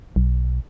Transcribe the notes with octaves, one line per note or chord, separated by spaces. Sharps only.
B1